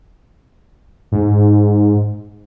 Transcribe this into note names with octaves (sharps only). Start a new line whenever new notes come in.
G#2